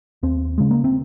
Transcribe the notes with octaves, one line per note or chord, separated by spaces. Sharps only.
D#2 C4
C#3 G#3
A#3
C4